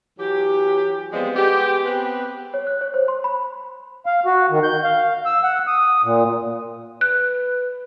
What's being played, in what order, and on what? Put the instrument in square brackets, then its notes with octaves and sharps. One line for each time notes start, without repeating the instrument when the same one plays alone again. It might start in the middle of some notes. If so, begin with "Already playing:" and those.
[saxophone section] E3 F#3 G4
F3 G3 G#3 B3 C4
G#3 B3 G4
B3 C4 B4
[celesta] C#5
F#6
C#5
C5
C6
B5
[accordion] F5
F#4
D#3
G6
F5
E6
F#5
D#6
A#2
[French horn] B4 [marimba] F#6